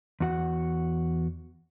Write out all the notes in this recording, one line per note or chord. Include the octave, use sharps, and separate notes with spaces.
E2 F#4 F#5